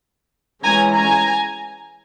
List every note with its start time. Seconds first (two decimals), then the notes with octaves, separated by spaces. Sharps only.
0.63 E3 G#3 C#4 G#5 A#5
0.93 G#5 A#5